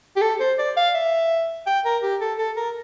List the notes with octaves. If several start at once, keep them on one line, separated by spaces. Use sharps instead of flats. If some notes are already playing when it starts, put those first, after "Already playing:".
G4
A4
C5
D5
F5
E5
G5
A#4
G4
A4
A4
A#4